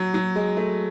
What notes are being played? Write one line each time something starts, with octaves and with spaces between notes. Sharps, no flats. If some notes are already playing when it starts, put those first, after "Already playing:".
Already playing: F#3
F#3
G#3
A3